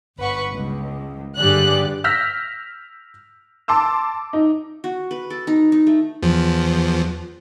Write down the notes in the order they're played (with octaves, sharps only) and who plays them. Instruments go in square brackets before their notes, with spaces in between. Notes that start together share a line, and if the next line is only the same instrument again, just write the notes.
[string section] G1 B4 F#5 C#6
C#2
G2 D3 G4 G#4 D5 F#6
[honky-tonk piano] E6 F6 G6 A#6 B6
A5 C6 D6 E6
D#4
[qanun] F#4
B4
A4
D#4
D#4
A3
[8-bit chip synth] E2 F3